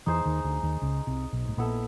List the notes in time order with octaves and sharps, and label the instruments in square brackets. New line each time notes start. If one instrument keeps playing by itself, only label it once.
[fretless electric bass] E2 E3 [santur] D#4 G#4 C5
[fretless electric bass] D#2 D#3
D2 D3
D#2 D#3
C#2 C#3
C2 C3
B1 B2
A2
[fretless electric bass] A#1 A#2 [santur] B3 E4 A4